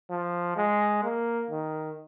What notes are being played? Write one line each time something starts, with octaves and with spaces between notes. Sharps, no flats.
F3
G#3
A#3
D#3